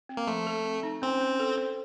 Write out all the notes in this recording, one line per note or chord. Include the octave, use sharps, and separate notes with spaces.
C4
A#3
F3 A3
A4
C4
D#4
C4 C#4
C#4
A4
C5